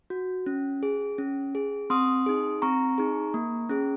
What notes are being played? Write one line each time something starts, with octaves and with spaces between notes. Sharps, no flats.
F#4
C#4
G#4
C#4
G#4
C4 C6 D#6
D#4 G#4
C4 A#5 C#6
D#4 G#4
A#3
C#4 G#4